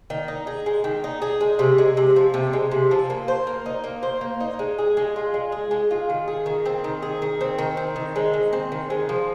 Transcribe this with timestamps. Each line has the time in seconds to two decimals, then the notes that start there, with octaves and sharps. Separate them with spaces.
0.10 D#3
0.28 D#4
0.47 G#4
0.66 G#3
0.84 D#3
1.04 D#4
1.22 G#4
1.41 G#3
1.59 C3
1.78 G#3
1.97 C3
2.16 F3
2.34 C3
2.53 G#3
2.71 C3
2.91 F3
3.10 A#3
3.28 C5
3.47 A#3
3.66 D#4
3.84 A#3
4.03 C5
4.21 A#3
4.40 D#4
4.59 G#3
4.78 G#4
4.97 G#3
5.16 F4
5.34 G#3
5.52 G#4
5.71 G#3
5.91 F4
6.10 D#3
6.28 G#4
6.46 D#3
6.66 C4
6.84 D#3
7.02 G#4
7.22 D#3
7.41 C4
7.58 D#3
7.77 C4
7.96 D#3
8.16 G#3
8.33 D#3
8.53 C4
8.72 D#3
8.90 G#3
9.09 F3